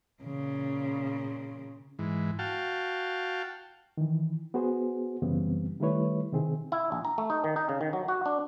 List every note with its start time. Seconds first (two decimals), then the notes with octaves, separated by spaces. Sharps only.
0.23 A#2 C#3
1.99 G#2 E3
2.39 F#4 F5 G5 A5
3.97 D#3 E3
4.54 B3 F#4 G#4 C5
5.22 F#2 C#3 E3 G3 B3 C4
5.80 D#3 G3 A3 E4 B4 C#5
6.32 C3 D#3 C4 G#4
6.72 E4
6.92 A#1
7.05 A#5
7.18 A3
7.30 D#4
7.44 D#3
7.56 D#4
7.69 C#3
7.81 D#3
7.93 F#3
8.08 F#4
8.26 D4